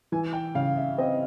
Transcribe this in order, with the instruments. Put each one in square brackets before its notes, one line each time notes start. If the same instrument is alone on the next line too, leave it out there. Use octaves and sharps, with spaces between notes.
[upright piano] E3 [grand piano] G#5
[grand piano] G5
[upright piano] C#3 [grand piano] F5
[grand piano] E5
[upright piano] C4 [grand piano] D#5